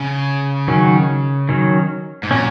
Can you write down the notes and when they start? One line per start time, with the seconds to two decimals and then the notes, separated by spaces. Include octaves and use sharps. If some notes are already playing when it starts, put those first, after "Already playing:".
Already playing: C#3
0.68 D#3 F#3 C#4
1.49 D#3 F#3 C#4
2.23 G#2
2.31 A#2 F#3 C#4